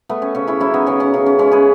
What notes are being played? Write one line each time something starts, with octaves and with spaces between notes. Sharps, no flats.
A3 B3
C#4
C#3 C#4
C#4 E4
F#3 C#4 E4
B3 D#4
C#3 C#4
C#4
C#3
C#4
G#3 C#4
G#4 B4